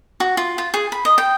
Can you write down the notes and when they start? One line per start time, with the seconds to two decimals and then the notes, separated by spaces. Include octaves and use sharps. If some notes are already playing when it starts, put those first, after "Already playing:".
0.20 F#4
0.37 F4
0.58 F4
0.74 G#4
0.92 B5
1.05 D#5
1.18 G5